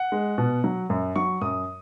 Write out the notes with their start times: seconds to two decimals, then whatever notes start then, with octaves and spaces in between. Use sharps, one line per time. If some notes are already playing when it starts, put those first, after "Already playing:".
Already playing: F#5
0.12 G#3
0.38 B2
0.64 F#3
0.90 F#2
1.16 F#3 C#6
1.41 F#2 D#6